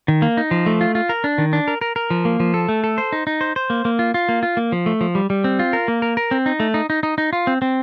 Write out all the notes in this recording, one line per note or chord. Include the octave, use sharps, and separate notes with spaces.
D#3
A#3
D#4
F3
A3
F4
F4
A#4
D4
D#3
D4
A#4
A#4
A#4
F3
A#3
F3
A4
A3
A4
C5
D#4
D#4
C5
C5
A#3
A#3
F4
F4
A#3
F4
A#3
F3
A3
F3
G3
G3
C4
F4
A#4
A#3
A#4
A#4
C4
D#4
A3
D#4
D#4
D#4
D#4
F4
C4
C4